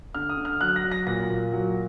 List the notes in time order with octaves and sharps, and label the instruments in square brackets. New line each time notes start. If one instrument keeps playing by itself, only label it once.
[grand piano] D3 F6
D#6
D3
F6
F#3 F#6
A#6
F#3
A#6
A#2 A#6
A#2
F#3